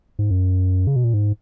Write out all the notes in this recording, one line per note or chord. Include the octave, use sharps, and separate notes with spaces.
G#2
F#2
C#3
B2
A#2
G#2